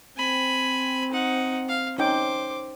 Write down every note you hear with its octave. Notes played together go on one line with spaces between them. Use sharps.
C4 G#5 B5
D#4 F#5
F5
C#4 D#4 C5 G5 D6